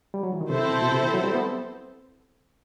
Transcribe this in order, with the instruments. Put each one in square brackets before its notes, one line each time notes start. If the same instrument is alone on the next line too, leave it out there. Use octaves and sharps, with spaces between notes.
[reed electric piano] G3
F#3
E3
D#3
[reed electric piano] C3 [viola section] C4 E4 A4 C5
[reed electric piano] B2
B2
C3
D#3
F#3
G3
B3